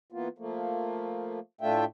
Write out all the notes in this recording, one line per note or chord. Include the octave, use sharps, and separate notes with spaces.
E3 A#3 B3 F4
F3 A3 A#3
A2 A3 D4 F4 E5 G5